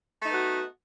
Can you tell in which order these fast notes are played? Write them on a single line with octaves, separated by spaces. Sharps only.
A3 D#4 B3 F#4